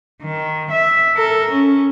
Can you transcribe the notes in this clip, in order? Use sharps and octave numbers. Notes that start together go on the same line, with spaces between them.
D#3
E5
A4 A#4
C#4